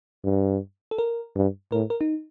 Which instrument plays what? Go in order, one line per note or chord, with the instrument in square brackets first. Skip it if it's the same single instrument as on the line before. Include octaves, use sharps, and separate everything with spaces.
[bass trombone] G2
[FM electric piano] A4
A#4
[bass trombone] G2
[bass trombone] A2 [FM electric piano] A#4
[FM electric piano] A#4
D#4